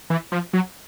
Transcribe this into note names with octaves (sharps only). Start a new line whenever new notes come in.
E3
F3
F#3